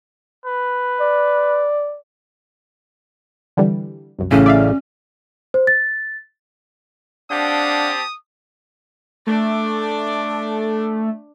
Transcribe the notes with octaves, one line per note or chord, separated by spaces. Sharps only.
B4
D5
D3 E3 G3
C2 F#2
A1 A2 C#3 C#4
D5 E5 F5
C5
A6
C4 D4 G4 F5 F#5 A5 D#6 G6
A3 D4 D5